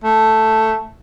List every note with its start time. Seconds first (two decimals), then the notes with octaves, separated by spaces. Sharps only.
0.04 A3